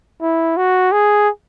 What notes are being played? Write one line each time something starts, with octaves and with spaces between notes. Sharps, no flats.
E4
F#4
G#4